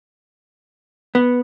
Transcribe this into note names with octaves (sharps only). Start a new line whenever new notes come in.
B3